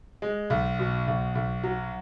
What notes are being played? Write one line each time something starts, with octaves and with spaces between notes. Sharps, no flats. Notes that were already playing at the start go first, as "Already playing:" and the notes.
G#3
B1
B2
B1
B1
F#3